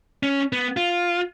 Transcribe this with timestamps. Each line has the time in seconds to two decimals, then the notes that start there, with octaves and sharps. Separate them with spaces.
0.23 C#4
0.53 B3
0.77 F4